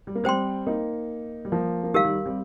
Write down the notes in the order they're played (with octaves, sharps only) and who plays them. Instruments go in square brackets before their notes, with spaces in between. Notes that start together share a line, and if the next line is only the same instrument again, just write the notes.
[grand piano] G3
A#3
[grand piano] G3 C4 [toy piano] C5 G5 C6
[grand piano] A#3 D#4
G3
F3 A#3
A#3
[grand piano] D#3 G3 [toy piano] G4 A#4 F5
[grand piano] D#3 G3
G3 C4